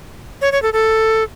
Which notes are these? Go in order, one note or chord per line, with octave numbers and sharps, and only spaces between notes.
C#5
C#5
A4
A4